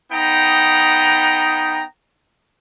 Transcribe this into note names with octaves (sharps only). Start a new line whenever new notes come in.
B3 D#4 G5 A#5